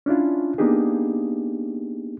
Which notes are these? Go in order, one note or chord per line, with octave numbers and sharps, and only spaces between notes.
C#4 D4 E4 F4
A#3 B3 D4 D#4 G4 G#4